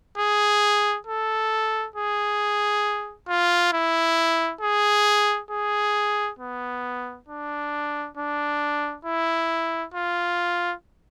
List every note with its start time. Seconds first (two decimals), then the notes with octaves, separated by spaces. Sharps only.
0.18 G#4
1.07 A4
1.96 G#4
3.28 F4
3.73 E4
4.61 G#4
5.51 G#4
6.39 B3
7.28 D4
8.17 D4
9.05 E4
9.94 F4